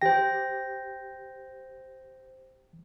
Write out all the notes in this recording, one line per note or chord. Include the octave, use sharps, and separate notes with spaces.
G4 C5 G5 A#6